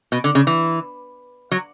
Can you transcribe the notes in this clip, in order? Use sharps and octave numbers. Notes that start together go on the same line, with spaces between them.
B2
D3
C#3
E3
F#3